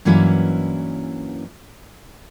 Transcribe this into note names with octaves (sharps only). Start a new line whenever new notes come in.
G2 E3 F#3 A#3 C#4 E4